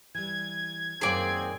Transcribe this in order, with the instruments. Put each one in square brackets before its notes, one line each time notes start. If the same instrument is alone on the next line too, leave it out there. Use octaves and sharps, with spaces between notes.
[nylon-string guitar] E3 G3 [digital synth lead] G#6
[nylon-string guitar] F#2 A#2 D#3 [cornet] C4 [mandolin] G#4 D5